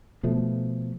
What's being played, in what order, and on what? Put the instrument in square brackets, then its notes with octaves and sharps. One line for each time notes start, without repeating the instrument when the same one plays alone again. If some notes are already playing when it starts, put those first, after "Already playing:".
[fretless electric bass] B2 F3 A3